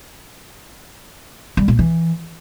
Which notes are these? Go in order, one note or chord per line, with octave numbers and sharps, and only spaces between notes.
G3
A#2
E3